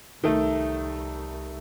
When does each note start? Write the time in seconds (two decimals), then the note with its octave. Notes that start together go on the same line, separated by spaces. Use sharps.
0.24 C2 D#3 A3